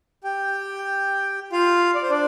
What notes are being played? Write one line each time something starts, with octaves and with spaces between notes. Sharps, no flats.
G4 G5
F4 F5
D5
C5
D4 D5